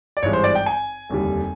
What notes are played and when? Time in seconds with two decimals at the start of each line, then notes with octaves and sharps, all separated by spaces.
0.17 D5
0.23 G#1 G2 E3 G#3 C#5
0.33 C5
0.44 D5
0.55 G5
0.66 G#5
1.10 F1 D#2 D3 G3